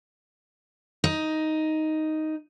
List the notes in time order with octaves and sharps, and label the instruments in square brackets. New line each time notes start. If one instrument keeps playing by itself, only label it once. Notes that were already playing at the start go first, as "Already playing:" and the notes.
[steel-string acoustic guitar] D#4